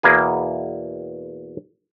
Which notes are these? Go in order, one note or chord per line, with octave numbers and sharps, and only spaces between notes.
E2 B2 A#3 G#4